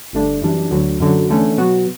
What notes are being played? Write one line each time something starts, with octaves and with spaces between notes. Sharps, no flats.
G1 G2 D3 A3 D4
F#2 E3 G3 D4
D2 D3 F#3
F#2 D3 F#3
E2 D3 A3 C#4
B2 F#3 B3 F#4